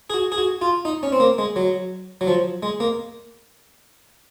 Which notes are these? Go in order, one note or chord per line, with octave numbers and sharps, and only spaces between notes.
G#4
F#4
G#4
F#4
F4
D#4
C#4
C4
A#3
G#3
F#3
F#3
F3
G#3
A#3